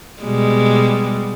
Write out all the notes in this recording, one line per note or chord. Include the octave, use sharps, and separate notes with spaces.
B2 G3 G#3